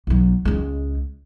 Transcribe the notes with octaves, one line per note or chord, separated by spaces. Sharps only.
B1 F#3
C#2 G#3